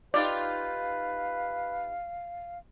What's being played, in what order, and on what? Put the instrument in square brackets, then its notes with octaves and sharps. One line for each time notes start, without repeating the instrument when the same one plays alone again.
[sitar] D#4 F4 G4 [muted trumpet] B4 [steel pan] D5 [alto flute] F5